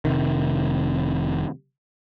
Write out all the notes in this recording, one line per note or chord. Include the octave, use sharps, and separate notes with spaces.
F1 C3 D#3